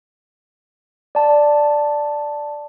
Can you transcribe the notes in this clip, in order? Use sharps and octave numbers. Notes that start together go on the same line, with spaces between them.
D5 A5